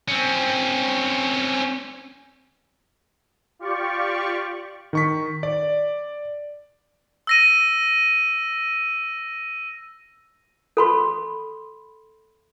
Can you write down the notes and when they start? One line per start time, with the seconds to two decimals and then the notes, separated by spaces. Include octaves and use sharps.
0.08 C4 C#4
3.59 F4 G4 D5 C#6
4.93 D#3 C#6 B6
5.43 D5
7.27 E6 A#6 D#7
10.77 A4 B5 C6